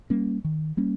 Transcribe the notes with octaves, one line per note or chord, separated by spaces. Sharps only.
G3 A#3 C#4
D#3
G3 A#3 C#4